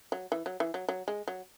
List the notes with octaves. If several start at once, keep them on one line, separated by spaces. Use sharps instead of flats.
F#3
E3
F#3
E3
F#3
F#3
G#3
F#3